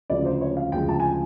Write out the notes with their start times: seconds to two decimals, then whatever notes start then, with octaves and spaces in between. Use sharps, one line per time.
0.10 D2 C#3 F3 G#3 D5
0.25 C5
0.41 C#5
0.57 F5
0.72 D2 C#3 F3 G#3 G5
0.89 A5
1.00 G#5
1.04 G5